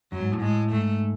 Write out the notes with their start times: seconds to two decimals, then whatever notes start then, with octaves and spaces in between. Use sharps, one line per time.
0.12 F#2 F#3
0.22 G#2
0.32 A2
0.38 G#2
0.42 A2 G#3
0.72 G#2 A3